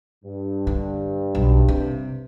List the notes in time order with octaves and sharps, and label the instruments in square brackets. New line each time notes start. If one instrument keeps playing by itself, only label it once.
[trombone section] G2
[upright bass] D3
B1
C3